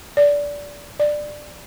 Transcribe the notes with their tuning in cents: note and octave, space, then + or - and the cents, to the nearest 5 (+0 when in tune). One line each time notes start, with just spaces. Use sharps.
D5 -20
D5 +15